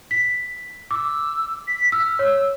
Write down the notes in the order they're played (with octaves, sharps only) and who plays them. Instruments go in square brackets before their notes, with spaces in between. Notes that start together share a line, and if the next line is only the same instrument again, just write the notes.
[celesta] B6
[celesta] D6 [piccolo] E6
[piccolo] B6
[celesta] E6 [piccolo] F6
[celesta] C#5 [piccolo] E6